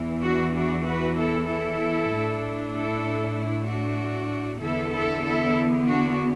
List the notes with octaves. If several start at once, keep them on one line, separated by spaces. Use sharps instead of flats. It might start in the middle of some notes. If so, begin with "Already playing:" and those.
Already playing: E2 E3
D4 F#4
D4 F#4
F#4 B4
E4 A4
E4 A4
A2 A3 D4
E4 A4
E4
D4 F#4
E2 D3 B3 E4 A4
E4 A4
E4 A4
D4 F#4